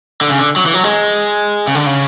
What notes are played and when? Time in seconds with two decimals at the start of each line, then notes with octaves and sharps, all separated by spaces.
0.21 D3
0.29 C#3
0.39 D3
0.56 F#3
0.66 E3
0.74 F#3
0.84 G#3
1.67 C#3
1.75 D3
1.86 C#3